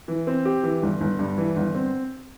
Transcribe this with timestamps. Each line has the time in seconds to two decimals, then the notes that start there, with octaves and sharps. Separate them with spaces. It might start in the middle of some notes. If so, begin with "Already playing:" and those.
0.08 E3
0.27 C4
0.45 G4
0.63 E3
0.83 G1
1.01 G1
1.19 G2
1.38 E3
1.56 G1
1.75 C4